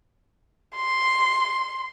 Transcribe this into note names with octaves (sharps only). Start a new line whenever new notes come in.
C6